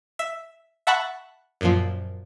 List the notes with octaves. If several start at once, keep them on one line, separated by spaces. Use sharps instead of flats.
E5
E5 F#5 A5 B5 C#6 F#6
F#2 A#2 F3